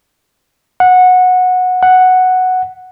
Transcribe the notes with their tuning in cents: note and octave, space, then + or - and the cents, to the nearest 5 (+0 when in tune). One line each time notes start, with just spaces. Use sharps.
F#5 -15
F#5 +0